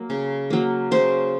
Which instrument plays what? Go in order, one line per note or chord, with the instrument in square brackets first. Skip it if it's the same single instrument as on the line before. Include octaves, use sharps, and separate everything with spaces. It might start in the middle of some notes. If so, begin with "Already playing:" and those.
Already playing: [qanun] F#3 A#3
C#3
F#3 A#3
C#3 C5